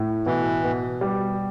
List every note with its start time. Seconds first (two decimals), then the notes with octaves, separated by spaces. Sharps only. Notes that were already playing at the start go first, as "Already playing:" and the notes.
Already playing: A2
0.26 B2 E3
0.64 B2
1.01 G3